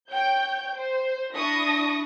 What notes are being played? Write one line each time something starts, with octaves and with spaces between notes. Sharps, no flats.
C#5 G5 G6
C5
D4 E4 C#6 D#6 A#6